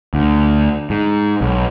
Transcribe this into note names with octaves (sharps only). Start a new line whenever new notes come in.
D2
G#2
B1